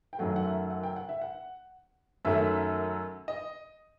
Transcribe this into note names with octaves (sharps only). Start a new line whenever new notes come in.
G5
F#2 D#3 F#3 A3 F#5
F#5
E5
F#5
G5
F#5
E5
F#5
F#2 D#3 F#3 A3 E5
D#5